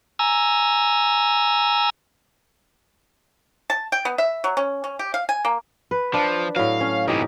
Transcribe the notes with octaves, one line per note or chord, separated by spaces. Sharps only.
G#5 A#5 E6
A5
G5
B3
E5
F#3
C#4
C#4
G4
F5
G#5
A#3
B4
F3 D4
A2 F#3 F5
C#4
C2 E3 D#4 G4